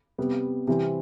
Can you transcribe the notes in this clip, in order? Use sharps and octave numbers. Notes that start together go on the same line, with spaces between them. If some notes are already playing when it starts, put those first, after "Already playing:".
C3 G3 B3
C3 E3 G3 C4